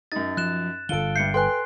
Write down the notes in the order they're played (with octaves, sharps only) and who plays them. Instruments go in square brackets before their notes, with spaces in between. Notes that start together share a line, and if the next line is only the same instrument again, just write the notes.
[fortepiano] F#2 D#4 [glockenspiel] A6
[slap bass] F3 [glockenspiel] F#6 E7
[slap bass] G1 D3 [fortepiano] F4 A4 [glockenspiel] D7 G7
[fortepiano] G2 E5 [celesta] G6 C#7 [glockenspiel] C7
[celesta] A4 B4 G#5 [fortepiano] G5 [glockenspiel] C6 F#6